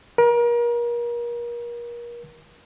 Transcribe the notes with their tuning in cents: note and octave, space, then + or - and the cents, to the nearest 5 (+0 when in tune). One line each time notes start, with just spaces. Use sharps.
A#4 +35